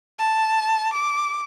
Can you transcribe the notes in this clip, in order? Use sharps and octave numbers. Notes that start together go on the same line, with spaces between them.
A5
D6